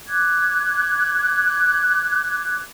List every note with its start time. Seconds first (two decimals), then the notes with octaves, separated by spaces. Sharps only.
0.09 D6 F#6 G#6